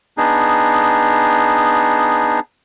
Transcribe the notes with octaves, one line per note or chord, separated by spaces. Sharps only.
B3 D4 D#4 G#4